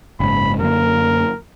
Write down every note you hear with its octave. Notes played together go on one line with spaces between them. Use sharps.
F#1 G#2 B5
F#2 D3 A#3 A#4